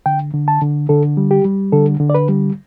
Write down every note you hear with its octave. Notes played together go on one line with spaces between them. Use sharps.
D3 G5
D3
A5
D3
D3 A4
G3
G4
G3
D3 A4
D3
D5
B4
G3